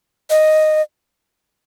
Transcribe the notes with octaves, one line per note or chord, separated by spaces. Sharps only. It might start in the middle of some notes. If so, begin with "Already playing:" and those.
D#5